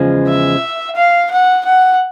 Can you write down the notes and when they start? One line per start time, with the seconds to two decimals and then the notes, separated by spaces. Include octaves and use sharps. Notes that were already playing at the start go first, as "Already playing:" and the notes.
Already playing: E2 C#3 F3 G#3
0.28 E5
0.96 F5
1.31 F#5
1.65 F#5